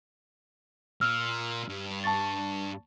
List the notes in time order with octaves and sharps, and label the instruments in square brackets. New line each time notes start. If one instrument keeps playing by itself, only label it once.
[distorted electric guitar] A#2 [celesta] E6 F6
[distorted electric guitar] G2
[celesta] A5 C#6 A6